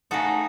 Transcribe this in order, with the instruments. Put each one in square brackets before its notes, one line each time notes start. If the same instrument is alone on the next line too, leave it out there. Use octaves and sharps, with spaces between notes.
[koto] C#3 A3 D#4 F#4